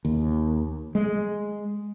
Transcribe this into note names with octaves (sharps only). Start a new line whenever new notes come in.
D#2
G#3